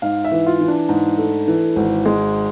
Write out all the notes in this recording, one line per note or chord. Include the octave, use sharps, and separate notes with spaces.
G#2 F5
E5
E3
F4
E3
D4
G#2
A3
E3
G#1
G#3